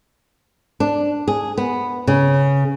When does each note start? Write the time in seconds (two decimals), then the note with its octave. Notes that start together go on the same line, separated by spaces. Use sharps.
0.80 D4
1.28 G#4
1.58 B3
2.07 C#3